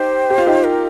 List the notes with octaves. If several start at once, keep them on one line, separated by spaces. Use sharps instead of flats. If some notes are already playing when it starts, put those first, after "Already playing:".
Already playing: D#4 G4 C5
G4
F4
D#4 G4
A#4